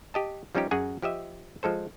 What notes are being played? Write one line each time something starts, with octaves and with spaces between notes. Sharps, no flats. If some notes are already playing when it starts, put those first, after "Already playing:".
G4 D#5 A5
F3 G3 C#4 D#4 G4
F#2 F#4 G#4 F#5 G#5
F3 G4 D#5 E5
F3 G#3 A4 C5